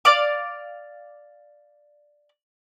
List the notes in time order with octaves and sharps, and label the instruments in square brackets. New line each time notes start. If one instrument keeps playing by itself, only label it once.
[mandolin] D5 F5 D6